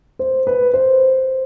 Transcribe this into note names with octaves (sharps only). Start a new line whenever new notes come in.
C5
B4
C5